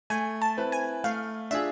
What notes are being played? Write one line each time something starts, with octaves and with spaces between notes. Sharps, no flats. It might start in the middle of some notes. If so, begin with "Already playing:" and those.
A3 G#5
A5
C4 E4 B4
G#5
A3 F5
D4 F4 G#4 E5